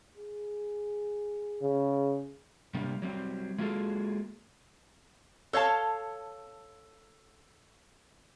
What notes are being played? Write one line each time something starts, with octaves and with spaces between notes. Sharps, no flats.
G#4
C#3
C3 G3 A#3 D4
F#3 G3 C4
G#3 A#3 F4 F#4 G#4 A4
A4 C#5 F5 A5